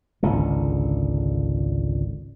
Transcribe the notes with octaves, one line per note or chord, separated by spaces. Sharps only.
G#1 C#2 D3